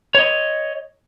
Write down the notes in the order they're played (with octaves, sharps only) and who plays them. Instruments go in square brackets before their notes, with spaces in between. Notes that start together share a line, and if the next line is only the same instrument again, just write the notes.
[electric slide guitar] C#5 D#5